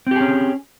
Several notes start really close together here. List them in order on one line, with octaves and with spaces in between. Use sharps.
C4 G4 G#4 C#4